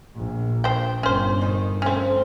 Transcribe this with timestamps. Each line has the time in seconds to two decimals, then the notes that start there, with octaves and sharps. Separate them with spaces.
0.16 A#1
0.64 C5 G5
1.03 G1 C#4 C5
1.41 D#3 D#4
1.82 F3 A3 C4 C#4